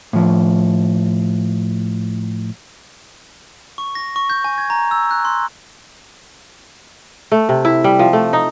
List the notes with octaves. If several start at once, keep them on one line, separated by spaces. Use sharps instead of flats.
A2 F3
C#6
A#6
C#6
G6
G#5
G#6
A#5
E6
F#6
C6
A3
C3
E4
G3
F3
A3
D#4